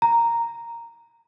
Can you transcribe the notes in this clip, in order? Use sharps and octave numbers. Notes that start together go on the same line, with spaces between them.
A#5